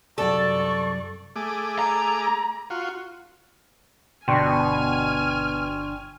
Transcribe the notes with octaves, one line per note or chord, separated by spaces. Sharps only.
C2 F#2 A4 D5 C#6
A3 G#4 D6
A#5
F4 F#4
G1 B2 D4 G5 G#5 C6 C#6 F6